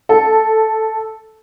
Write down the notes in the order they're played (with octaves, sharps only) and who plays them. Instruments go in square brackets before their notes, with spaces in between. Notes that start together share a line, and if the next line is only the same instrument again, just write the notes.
[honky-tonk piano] A4